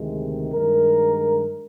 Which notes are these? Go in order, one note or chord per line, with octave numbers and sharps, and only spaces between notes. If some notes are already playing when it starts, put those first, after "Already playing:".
Already playing: D2 C3 D#3 G#3
G2 D#3 G#3 A#4